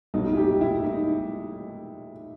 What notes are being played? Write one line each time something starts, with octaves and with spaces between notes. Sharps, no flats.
B1 A#2 G3 A#3 D#4
E4
G4
E4
D#4